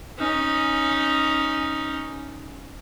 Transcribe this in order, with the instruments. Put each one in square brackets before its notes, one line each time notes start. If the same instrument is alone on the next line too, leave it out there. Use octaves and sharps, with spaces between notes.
[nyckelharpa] C#4 D#4